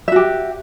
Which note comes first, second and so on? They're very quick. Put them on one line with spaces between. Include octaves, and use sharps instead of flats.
E5 F#4 G4